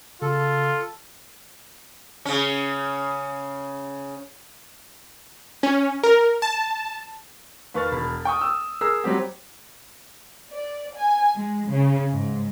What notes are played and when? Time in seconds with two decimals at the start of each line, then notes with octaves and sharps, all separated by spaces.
0.22 C#3 F4 A4
2.25 C#3 C#4
5.63 C#4
6.04 A#4
6.42 A5
7.74 D#2 B4 C#6 F6 A6
7.92 E1 B5
8.25 G5 C#6 D#6
8.41 D#6 E6
8.81 G#4 A#4 E6
9.04 F#3 G3 C4 G4
10.52 D5
10.96 G#5
11.37 G#3
11.70 C#3
12.11 G#2